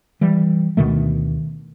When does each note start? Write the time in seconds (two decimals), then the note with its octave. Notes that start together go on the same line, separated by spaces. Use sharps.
0.21 E3 G3
0.77 D2 B2 D#3 A3